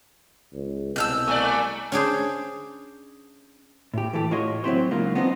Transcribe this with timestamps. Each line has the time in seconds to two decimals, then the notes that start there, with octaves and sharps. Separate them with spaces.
0.53 C#2
0.96 C2 B2 A5 E6 F6 G6
1.27 G#3 A#4 D5 F5 G#5
1.92 C#4 D4 G#4 C5
3.94 A2 G4
4.13 E3 A3 G4
4.31 A2 F4 F#4 C#5 D#5 C6
4.64 F#3 G#3 C4 E4 G4 C5
4.91 C#2 C#3 F#3 A#3 D#4 F4
5.15 B3 C4 D4 D#4 F4 D#5